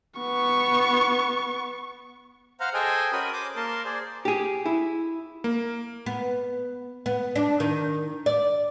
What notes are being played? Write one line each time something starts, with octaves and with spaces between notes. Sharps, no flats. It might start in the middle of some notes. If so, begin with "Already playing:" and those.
B3 C#6
C5 F5 F#5 A#5 F6
G#4 A4 C5 D#5 G5 G#5
C#4 F#4 A#4 B5 D#6
C5 D6 D#6
A#3 A#4 A5 C6
G#4 C5 D5
G4 G#4
E4
A#3
B3
B3
D4
D#3
D5